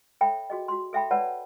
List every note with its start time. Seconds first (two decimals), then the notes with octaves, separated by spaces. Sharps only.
0.21 A4 C#5 E5 G5 B5
0.50 F#4 G#4 D#5
0.68 F#4 C6
0.93 A4 E5 G5 B5
1.11 B4 C#5 D5 F#5 A5 B5